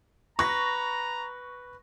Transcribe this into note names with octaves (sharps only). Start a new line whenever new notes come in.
B4 A#5 C#6 A#6